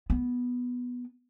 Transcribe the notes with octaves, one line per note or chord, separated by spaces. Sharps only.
B3